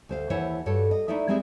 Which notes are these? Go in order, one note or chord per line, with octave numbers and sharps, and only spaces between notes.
D2 C5 F5
D#2 E3 E4 C5 C#5 F#5
G2 F#4 A4 C#5
D#5
A3 D#4 E4 D5 E5
G3 G#3 C4 E4 G#4 E5